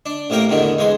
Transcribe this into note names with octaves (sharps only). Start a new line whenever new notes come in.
D4
A1 C3 A#3 A#4 G5
E2 D3 D#3
E2 G#3 C6